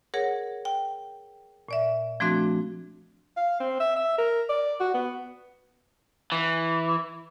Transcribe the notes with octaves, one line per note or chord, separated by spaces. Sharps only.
G#4 A#4 C#5 F#5
G5
A#2 D5 E5
F3 A3 C4 D4 F#4
F5
C4
E5
E5
A#4
D5
F#4
B3
E3